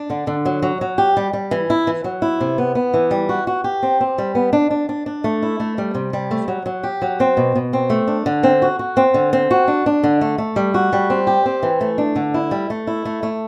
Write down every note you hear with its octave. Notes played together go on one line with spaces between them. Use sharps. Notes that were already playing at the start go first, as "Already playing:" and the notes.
Already playing: D4
D3
D3
F#3
F#3
F#3
G4
G3
G3
E3
E4
E3
F#3
E4
C3
B3
B3
E3
G3
F#4
F#4
G4
C4
C4
G3
B3
D4
D4
D4
D4
A3
E4
A3
G3
C3
G3
A3
F#3
F#3
G4
F#3
C4
B2
B2
C4
A3
D4
D3
C4
F#4
F#4
C4
D3
C4
F#4
D4
D4
D3
A3
A3
G3
F#4
G3
C4
G4
C4
E3
A3
D4
D3
E4
G3
A3
E4
A3
A3